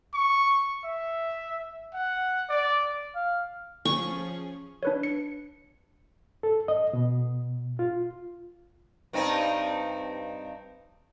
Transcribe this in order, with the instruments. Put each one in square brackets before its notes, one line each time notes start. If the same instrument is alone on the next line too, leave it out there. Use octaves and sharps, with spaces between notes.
[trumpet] C#6
E5
F#5
D5
[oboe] F5
[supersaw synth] F3 C#4 G#4 [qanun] C#6
[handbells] D4 B4 C#5
C#7
[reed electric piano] A4
D#5
B2
F4
[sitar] G2 C4 D#4